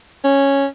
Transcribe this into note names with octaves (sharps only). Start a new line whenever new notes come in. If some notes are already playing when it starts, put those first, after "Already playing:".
C#4